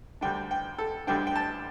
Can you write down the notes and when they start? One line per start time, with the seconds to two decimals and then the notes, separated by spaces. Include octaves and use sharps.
0.21 D2 D3 G3 D4 G5
0.51 G5
0.78 A4
1.07 D2 D3 G3 D4 G5
1.27 G5
1.36 A5